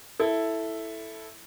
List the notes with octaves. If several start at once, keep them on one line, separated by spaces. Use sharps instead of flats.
E4 A4